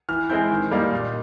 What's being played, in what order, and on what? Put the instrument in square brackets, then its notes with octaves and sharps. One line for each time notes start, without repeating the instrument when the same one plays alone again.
[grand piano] E3 F6
G#3 C4 E4 G6
D#3
G3 A#3 D#4
A#2